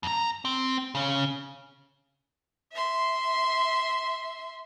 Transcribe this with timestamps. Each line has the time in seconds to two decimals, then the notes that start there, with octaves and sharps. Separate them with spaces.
0.03 F2 A#5
0.45 C4
0.95 C#3 C#4
2.72 E5 C6